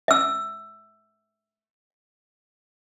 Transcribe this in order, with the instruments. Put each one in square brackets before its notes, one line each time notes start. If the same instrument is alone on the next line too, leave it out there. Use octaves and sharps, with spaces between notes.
[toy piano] E5 E6